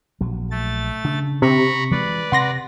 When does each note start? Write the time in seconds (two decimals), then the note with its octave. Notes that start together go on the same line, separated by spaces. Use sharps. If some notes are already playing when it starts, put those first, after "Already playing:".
0.21 A#1 F#3
0.51 A3 A6
1.04 C#3 D4
1.42 C3 A#5 B5 C#6
1.91 E3 G#3 B4 D5
2.32 C3 F#5 C6 A#6